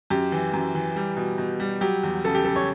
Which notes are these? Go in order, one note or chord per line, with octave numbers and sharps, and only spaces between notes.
F#2 G4
E3
F#2
E3
G3
B2
B2
G3
F#3 G4
E2
C#3 A4
G4
C#3 A4
C#5